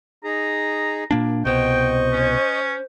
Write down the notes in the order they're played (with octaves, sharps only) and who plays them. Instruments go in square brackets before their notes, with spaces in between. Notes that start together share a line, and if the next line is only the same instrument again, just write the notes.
[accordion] D#4 G#4 [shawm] A#5
[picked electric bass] A#2 A#3 D4
[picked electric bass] C2 B2 [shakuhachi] C5 [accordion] D#5 C#6 [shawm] G5
[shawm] C#4